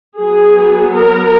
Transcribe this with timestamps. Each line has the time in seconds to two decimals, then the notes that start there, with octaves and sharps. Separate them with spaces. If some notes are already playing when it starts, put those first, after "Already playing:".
0.21 F#3 B3 G#4
0.99 A#4